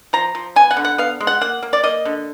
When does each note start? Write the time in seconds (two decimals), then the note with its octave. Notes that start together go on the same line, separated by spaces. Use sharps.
0.13 F3 A#5
0.35 F3
0.56 B3 G#5
0.71 F#5
0.77 D3
0.85 F#5
0.98 B3 F5
1.21 G#3
1.27 F#5
1.41 A#3 F#5
1.63 A#3
1.73 D5
1.84 A#3 D#5
2.05 D3